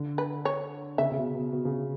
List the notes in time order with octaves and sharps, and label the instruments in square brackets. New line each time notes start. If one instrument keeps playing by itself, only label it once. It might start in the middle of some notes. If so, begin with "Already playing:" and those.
Already playing: [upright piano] D3
[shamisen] B4
C#5
[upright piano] C#3 [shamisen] E5
[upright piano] C#3
B2
B2
B2
C#3
B2